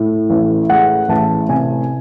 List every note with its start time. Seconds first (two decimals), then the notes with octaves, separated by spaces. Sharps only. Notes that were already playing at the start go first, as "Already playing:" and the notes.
Already playing: A2
0.30 A1
0.69 G#3 F#5
1.09 A1 A5
1.49 C3 G#5